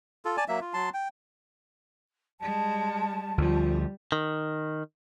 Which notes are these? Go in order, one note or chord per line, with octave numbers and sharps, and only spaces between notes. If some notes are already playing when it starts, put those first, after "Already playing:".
F4 A4
D5 G#5 A5
F#3 A#3 E5
F4
F#3 A5 C6
G5
G3 G#3 A5
D2 F3 G3 F4
D#3